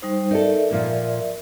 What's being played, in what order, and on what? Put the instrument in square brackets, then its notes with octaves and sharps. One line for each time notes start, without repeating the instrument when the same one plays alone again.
[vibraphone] G3 D#4 C5
[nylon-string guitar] D#4 A4 [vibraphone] A#4 D5 E5
[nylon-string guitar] A#2 F3 A#3